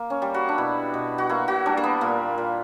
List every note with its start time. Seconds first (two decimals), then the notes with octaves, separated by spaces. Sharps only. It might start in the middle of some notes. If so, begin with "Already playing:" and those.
Already playing: A#3
0.10 C#4
0.22 G3
0.34 F#4
0.49 D4
0.58 B2 E4
0.94 B2
1.18 F#4
1.29 A#3 E4
1.48 F#4
1.66 G3 D4
1.77 A#3
1.84 B3
2.01 A#2 A#3
2.38 A#2